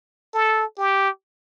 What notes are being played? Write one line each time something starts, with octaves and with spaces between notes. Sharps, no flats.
A4
G4